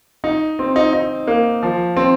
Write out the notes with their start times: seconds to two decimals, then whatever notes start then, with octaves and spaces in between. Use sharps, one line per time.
0.24 D#4
0.59 C4
0.76 D#4
0.93 D#4
1.27 A#3
1.63 F3
1.97 C4